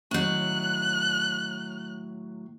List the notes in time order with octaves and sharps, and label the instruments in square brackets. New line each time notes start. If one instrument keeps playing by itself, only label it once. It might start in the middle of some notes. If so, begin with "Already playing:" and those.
[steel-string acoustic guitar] A2 F#3 [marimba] D#3 C#4 [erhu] F#6